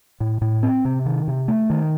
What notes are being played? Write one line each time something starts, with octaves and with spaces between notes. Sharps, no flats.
A2
A2
C4
C3
D#3
C3
A3
D#3